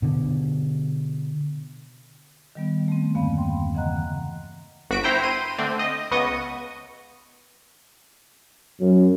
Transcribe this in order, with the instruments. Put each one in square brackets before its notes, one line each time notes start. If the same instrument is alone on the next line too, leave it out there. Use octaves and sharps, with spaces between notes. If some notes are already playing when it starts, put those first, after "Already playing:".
[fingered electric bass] B2 D3
[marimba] D#3 G3 B3
A3 C4
E2 G2 D3 A#3 F5 B5
G5 C6
C#3 E3 D#5 F#5 A#5 F#6
[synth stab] G1 F#4 B6 D7
E4 C5 G5 A#5
C6 D#7
D3 A3 C4
D#5
C#2 B3 D#5 C#6 D#6
[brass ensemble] F#2